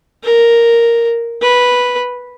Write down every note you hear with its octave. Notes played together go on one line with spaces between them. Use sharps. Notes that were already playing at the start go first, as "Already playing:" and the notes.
A#4
B4